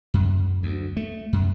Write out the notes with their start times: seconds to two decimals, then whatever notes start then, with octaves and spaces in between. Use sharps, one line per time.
0.14 F#2
0.63 D2
0.97 A3
1.33 F#2